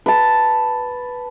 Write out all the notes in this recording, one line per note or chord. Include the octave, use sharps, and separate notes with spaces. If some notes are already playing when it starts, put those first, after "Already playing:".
B4 A5